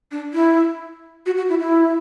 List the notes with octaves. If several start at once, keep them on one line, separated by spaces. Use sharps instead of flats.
D4
E4
F#4
F#4
E4
E4